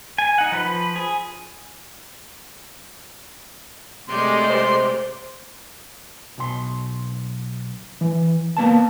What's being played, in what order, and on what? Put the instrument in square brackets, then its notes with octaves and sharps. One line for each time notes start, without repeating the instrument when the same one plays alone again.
[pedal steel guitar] G#5
D#4 F#5
F3 B4 B5
G#4
[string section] C3 G#3 A3 [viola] G4 D5 [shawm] C6
[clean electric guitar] C5
B1 C6
E3
C#2 A#3 B3 A5